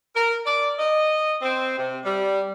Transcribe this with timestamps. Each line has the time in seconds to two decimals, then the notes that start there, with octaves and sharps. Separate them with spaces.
0.15 A#4
0.46 D5
0.79 D#5
1.42 C4
1.78 C3
2.05 G3